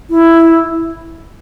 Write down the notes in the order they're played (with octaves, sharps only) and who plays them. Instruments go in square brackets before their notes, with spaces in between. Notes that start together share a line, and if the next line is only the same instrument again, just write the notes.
[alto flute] E4